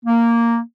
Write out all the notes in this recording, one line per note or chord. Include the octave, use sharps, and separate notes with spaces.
A#3